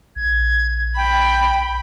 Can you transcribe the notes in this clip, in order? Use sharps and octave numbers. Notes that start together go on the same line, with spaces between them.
A#1 G#6
G5 B5